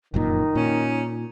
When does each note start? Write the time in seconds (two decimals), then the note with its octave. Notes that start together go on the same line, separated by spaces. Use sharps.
0.14 F1 F#2 A#2 D#3 D#4
0.55 A#2 C#4